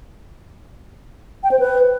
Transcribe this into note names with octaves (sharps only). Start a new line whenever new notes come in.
G5
C5
B4